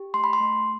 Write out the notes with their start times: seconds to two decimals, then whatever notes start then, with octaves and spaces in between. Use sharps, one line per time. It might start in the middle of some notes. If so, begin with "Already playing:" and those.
Already playing: G4
0.14 A3 C6
0.24 B5
0.33 C6
0.40 A3